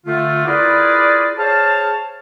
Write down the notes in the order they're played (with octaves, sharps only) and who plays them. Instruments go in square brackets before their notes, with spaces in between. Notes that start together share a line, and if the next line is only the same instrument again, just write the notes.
[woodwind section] D3 A3 F4
E4 F4 G#4 A#4 B4 D5
G#4 C5 C#5 F5 A5